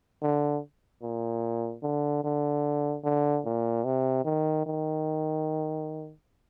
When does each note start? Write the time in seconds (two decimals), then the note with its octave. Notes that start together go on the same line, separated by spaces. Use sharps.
0.22 D3
1.02 A#2
1.83 D3
2.24 D3
3.04 D3
3.45 A#2
3.85 C3
4.25 D#3
4.66 D#3